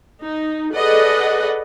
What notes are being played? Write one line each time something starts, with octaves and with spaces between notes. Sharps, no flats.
D#4
G#4 A4 B4 D5 D#5 F#5